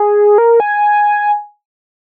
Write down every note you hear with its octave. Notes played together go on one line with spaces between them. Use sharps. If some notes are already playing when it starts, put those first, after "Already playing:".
Already playing: G#4
A#4
G#5